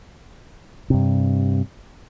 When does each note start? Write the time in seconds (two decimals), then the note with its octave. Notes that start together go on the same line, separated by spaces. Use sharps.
0.90 G2 C3